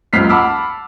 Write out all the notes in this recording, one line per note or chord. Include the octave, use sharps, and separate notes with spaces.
C#2 F#2 F6 B6 C7
F#5 A5 B5 D6 E6 F6